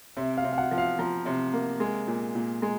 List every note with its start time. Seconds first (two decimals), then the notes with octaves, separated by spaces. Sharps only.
0.17 C3 E5
0.37 F5
0.44 C3
0.53 F5
0.58 F#5
0.71 F3
0.78 F5
0.99 F3 A#5
1.26 C3
1.53 A#3
1.80 G#3
2.07 A#2
2.35 A#2
2.62 G#3 A#5